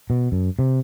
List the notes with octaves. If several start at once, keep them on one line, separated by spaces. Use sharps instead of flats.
B2
F#2
C3